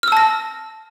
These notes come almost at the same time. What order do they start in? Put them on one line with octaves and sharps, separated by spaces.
F6 E6 A5 A#6